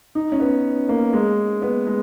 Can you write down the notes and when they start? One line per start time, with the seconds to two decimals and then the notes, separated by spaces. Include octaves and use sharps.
0.15 D#4
0.32 C#4
0.40 B3
0.89 A#3
1.13 G#3
1.62 B3
1.87 G#3